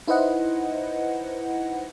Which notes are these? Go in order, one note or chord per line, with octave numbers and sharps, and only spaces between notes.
D#4 E4 B4 C5 D#5 F#5